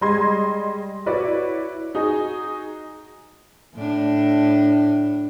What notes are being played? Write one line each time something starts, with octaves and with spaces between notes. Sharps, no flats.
G3 G#3 D#5 C6 G#6
E4 F#4 B4 C#5 D5
D#4 F#4 G#4
A2 D4